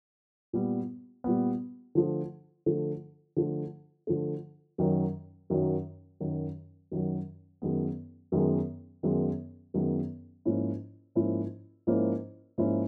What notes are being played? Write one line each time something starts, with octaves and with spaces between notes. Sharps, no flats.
A#2 G3 B3
A#2 G3 B3
D3 F3 A3
D3 F3 A3
D3 F3 A3
D3 F3 A3
F#2 D#3 F#3
F#2 D#3 F#3
F#2 D#3 F#3
F#2 D#3 F#3
F#2 D#3 G#3 B3
F#2 D#3 G#3 B3
F#2 D#3 G#3 B3
F#2 D#3 G#3 B3
G#2 F3 A#3 C#4 E4
G#2 F3 A#3 C#4 E4
G#2 F3 A#3 C#4 E4
G#2 F3 A#3 C#4 E4